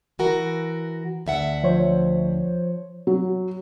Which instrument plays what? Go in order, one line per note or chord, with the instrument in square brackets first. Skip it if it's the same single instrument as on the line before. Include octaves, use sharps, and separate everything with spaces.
[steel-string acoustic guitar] E3 F#4 A#4
D2 E5 F#5
[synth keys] F3 C5 C#5
[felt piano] F#3